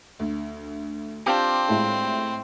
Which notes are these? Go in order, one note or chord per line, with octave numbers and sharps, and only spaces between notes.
D2
C4 D4 F4 G4
A2 G#3 E4